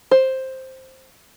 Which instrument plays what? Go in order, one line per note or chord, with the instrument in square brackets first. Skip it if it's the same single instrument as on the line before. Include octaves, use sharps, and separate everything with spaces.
[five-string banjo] C5